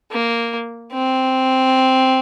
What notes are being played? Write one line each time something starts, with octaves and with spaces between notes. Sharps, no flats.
A#3
C4